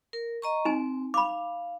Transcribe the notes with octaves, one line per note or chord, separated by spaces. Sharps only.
A#4
D#5 A#5 C#6
C4 D#4 G#5
F5 B5 D6